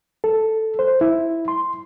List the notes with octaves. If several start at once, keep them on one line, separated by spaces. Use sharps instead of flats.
A4
C5
E4
C6